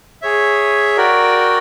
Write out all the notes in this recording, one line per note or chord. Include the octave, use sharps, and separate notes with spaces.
G#4 C#5 E5
F#4 A#4 D5 G5